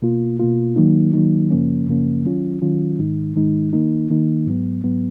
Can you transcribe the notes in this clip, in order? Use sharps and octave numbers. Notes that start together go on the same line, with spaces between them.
B2 A#3 F4
B2 A#3 F4
D#3 F#3 A#3 D#4
D#3 F#3 A#3 D#4
F#2 C#3 F3 A#3 C#4
F#2 C#3 F3 A#3 C#4
D#3 F#3 C#4 F4
D#3 F#3 C#4 F4
G#2 D#3 G#3 D#4
G#2 D#3 G#3 D#4
D#3 A#3 D#4
D#3 A#3 D#4
G#2 F#3 B3
G#2 F#3 B3